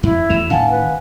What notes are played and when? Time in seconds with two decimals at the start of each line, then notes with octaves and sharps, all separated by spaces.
0.03 F2 E4
0.30 E2 F#3 A3 E7 F7
0.51 A2 D#3 C#4 F5 F#5 G#5 A5
0.70 B4